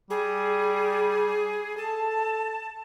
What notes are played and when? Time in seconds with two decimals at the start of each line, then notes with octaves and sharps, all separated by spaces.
0.10 G3 G#4
1.77 A4 A5